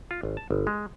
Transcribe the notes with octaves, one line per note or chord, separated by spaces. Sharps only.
F4
G#1
A5
G1
G#3